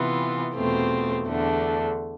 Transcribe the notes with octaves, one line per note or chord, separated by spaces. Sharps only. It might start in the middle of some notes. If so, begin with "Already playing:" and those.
Already playing: C3 E3 B3 F4
E2 B2 A3 C4 F4
E2 D3 A3 D4